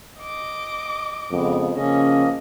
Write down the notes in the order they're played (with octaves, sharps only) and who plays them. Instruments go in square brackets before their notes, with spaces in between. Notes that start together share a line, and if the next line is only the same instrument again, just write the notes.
[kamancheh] D#5 D6
[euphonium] F2 [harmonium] C#3 G#3 B3
[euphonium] C#3 [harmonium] F3 A#3 D#5 [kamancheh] C#4